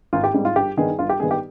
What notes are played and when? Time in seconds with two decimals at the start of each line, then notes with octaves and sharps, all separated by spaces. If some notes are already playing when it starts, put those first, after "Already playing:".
0.13 G#1 F4
0.24 G4
0.34 G#2 G3 C4
0.45 F4
0.56 G1 G4
0.77 G2 D#3 B3 G#4
0.99 G1 F4
1.09 G4
1.20 G2 D#3 B3 G#4
1.31 G4